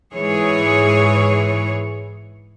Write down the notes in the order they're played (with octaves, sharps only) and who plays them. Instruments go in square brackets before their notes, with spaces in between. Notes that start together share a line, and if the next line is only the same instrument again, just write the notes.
[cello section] G#2 E3 G#4 C#5